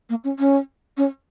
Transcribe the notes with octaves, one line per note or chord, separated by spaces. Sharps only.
A#3
C#4
C#4
C#4